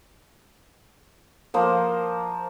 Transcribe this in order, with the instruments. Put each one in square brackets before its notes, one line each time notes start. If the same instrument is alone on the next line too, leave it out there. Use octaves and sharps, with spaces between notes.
[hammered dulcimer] F3 A#3 C5